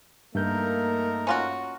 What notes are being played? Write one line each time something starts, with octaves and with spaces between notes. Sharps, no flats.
G2 A3 A#3 D#4 A#4 G6
C#4 F4 F#4